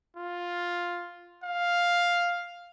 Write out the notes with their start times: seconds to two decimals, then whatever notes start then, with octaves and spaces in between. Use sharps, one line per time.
0.17 F4
1.44 F5